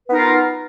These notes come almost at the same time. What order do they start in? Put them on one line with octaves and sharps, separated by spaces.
B4 B3 D#4 A#4 F4